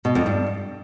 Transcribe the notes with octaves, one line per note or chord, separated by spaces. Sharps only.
B2
F2
G2